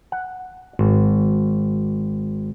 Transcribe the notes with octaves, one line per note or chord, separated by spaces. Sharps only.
F#5
G#1